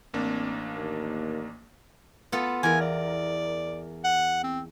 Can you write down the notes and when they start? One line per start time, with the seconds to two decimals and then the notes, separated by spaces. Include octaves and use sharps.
0.14 A1 A#3 C4 D4
0.76 D#2
2.32 B3 F4 A4
2.63 E2 A#4 G#5
2.81 D5
4.04 F#5
4.43 C4